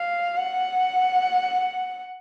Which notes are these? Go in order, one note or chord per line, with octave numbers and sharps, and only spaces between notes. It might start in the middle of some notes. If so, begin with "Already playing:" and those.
Already playing: F5
F#5